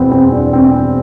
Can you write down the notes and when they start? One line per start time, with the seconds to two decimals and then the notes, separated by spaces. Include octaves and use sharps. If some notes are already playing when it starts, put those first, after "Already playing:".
Already playing: E2 B2 B3 C4
0.11 C4
0.32 D4
0.53 C4